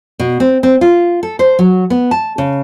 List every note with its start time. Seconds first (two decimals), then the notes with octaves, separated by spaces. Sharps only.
0.20 B2
0.40 C4
0.63 C4
0.81 F4
1.23 A4
1.39 C5
1.59 F#3
1.90 B3
2.11 A5
2.38 C#3